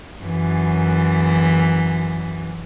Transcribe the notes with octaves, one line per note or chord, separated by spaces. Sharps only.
F#2 E3